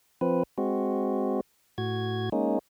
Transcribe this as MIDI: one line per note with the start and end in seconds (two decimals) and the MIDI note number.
0.21 0.43 53
0.21 0.43 60
0.21 0.43 71
0.58 1.41 56
0.58 1.41 60
0.58 1.41 66
1.78 2.29 45
1.78 2.29 66
1.78 2.29 92
2.32 2.59 56
2.32 2.59 58
2.32 2.59 61
2.32 2.59 63